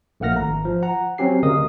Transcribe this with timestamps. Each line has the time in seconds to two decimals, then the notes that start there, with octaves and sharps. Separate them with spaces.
0.20 A#1 A3 A#3 F#5 F6 A#6
0.36 G#1 A#5
0.65 F3
0.83 F#5 A#5
1.18 F#3 C4 C#4 G4 C7
1.43 D2 C#3 A#4 D#5 D#6